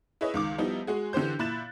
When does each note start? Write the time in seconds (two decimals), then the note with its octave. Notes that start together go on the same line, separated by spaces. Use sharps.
0.21 E4 G#4 B4 C#5 D#5
0.34 C#2 D#3 D6
0.58 F3 G3 B3 D#4 E4
0.87 G#3 F#4 G#4
1.13 D3 E3 G4 C5 G6
1.39 A#2 E4 B5 F#6 A6 E7